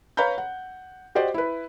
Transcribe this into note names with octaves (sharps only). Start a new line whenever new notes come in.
B4 C#5 F5 A#5 B5 G6
F#5
F#4 G4 C5 D5 D#5
E4 B4